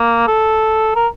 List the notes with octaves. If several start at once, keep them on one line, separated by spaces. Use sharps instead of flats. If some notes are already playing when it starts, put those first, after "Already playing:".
Already playing: A#3
A4
A#4